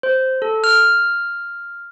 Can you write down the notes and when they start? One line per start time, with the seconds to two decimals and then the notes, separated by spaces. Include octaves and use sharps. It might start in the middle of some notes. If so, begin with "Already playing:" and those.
0.03 C5
0.42 A4
0.64 F6